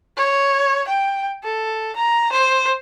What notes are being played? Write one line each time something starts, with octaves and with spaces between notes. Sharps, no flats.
C#5
G5
A4
A#5
C5